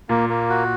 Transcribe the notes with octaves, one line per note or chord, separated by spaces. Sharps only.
A#2 A#3
A#3
F#4